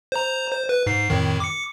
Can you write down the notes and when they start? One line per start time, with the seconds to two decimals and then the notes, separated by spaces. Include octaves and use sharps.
0.12 C5 A#5
0.51 C5
0.69 B4
0.87 G#2 C7
1.10 F2 A2 D#3
1.40 D6 C#7